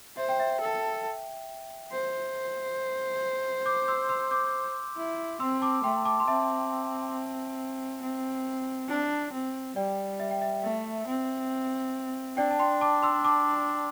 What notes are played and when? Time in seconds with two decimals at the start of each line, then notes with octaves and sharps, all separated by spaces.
0.17 C5 E5
0.29 G5
0.40 E5
0.60 A4
1.92 C5
3.66 D6 G6
3.88 C6 E6
4.09 C6 E6
4.31 D6 G6
4.97 E4
5.40 C4 C6 E6
5.62 A5 D6
5.83 A3 G5 C6
6.05 A5 D6
6.20 C6
6.27 C4 E5 A5
8.02 C4
8.88 D4
9.32 C4
9.76 G3 D5 G5
10.20 E5
10.31 G5
10.42 E5
10.63 A3 E5
11.07 C4
12.37 D4 D5 G5
12.51 A5
12.59 G5 C6
12.81 A5 D6
13.03 C6 E6
13.24 A5 D6